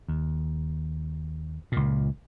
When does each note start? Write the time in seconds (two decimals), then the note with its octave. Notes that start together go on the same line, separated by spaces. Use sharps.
0.08 D#2
1.72 C#2 A#2